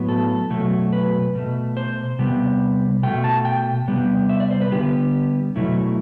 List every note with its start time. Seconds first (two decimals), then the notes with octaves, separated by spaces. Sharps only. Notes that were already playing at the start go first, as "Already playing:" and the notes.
Already playing: A2 F#3 B3
0.09 A4
0.50 B2 F#3 A3
0.92 B4
1.35 B2 A3
1.77 C5
2.19 C3 G3 B3
3.03 B2 A3 G5
3.24 A5
3.45 G5
3.88 C3 G3 B3
4.29 E5
4.40 D5
4.51 C5
4.61 B4
4.72 D3 G3 B3 G4
5.56 B2 F#3 A3 E4